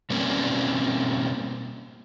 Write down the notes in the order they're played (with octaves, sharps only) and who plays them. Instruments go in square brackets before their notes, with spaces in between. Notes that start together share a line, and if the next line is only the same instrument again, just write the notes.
[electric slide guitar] B2 G3 A#3 C4 C#4